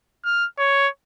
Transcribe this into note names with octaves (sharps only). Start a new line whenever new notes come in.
F6
C#5